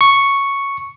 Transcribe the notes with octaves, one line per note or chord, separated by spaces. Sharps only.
C#6